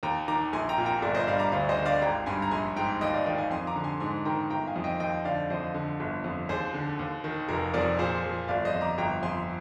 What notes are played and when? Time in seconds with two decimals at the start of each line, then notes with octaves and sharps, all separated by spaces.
0.03 D#2 G5 A#5
0.28 D#3 A#5 D6
0.53 A#1 G#5 C6
0.69 G5 A#5
0.78 A#2
0.86 G5 A#5
1.02 G1 A#4 D5
1.15 C5 D#5
1.27 G2 D5 F5
1.39 A#5 D6
1.52 D2 D5 F5
1.69 C5 D#5
1.76 D3
1.85 D5 F5
2.02 G#1 G5 A#5
2.26 G2 G#5 C6
2.42 A#5
2.51 A#1 G#5 C6
2.76 G#2 G5 A#5
3.01 D#2 D#5 G5
3.14 D5 F5
3.26 D#3 D#5 G5
3.38 F5 G#5
3.51 F2 G#5 C6
3.67 A#5 D6
3.76 D3
3.84 G#5 C6
4.00 G#2 G#5 C6
4.25 D#3 G5 A#5
4.50 G1 G5 A#5
4.67 F5 G#5
4.76 F2
4.84 D#5 G5
5.00 D#2 D#5 G5
5.25 D3 D5 F5
5.50 F2 C5 D#5
5.74 D3
6.00 G1
6.24 F2
6.49 D#2 G#4 C5
6.74 D3
6.99 D#2
7.24 D#3
7.49 F1 A#4
7.74 F2 A#4 D5
7.99 A#2 G#4 C5
8.23 F3 G#4
8.48 G1 D5 F5
8.65 C5 D#5
8.73 F2
8.81 A#5 D6
8.98 G1 G5 A#5
9.23 F2 G#5 C6